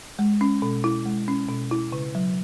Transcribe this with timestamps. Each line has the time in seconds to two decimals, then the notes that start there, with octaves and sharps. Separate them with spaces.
0.19 G#3
0.41 C#4
0.62 B2
0.84 E4
1.05 G#3
1.28 C#4
1.49 B2
1.71 E4
1.92 C#3
2.15 F#3